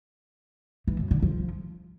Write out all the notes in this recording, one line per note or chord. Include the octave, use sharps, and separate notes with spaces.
E3
F#2
D3
F3